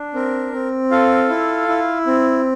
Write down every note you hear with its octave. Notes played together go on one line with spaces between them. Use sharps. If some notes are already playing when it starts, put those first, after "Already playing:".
Already playing: D4
C4 A#4
C4
F4 A4 F5
E4
E4
C4